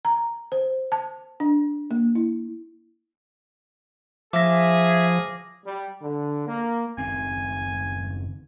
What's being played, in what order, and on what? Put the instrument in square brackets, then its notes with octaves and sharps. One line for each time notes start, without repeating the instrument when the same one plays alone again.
[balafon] A#5
C5
A5
D4
A#3
E4
[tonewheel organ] F3 [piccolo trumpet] G#4 [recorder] E5 [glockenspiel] D6 A#6
[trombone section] G3
D3
A#3
[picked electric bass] F#1 D#3 C4 [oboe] G#5